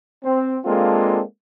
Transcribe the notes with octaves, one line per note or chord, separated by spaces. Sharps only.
C4
G#3 A#3 C4 D4 F4 A4